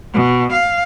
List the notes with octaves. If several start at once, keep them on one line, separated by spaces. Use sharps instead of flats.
B2
F5